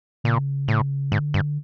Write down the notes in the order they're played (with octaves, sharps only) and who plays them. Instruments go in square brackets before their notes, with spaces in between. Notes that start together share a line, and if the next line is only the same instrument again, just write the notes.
[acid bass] A#2 [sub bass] C#3
[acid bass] A2
[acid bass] G#2 [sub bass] D3
[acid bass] G2